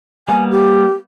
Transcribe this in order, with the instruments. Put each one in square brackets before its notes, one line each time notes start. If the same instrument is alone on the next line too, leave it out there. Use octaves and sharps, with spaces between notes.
[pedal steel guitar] G3 A#3 B3 [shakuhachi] G#5
[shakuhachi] G4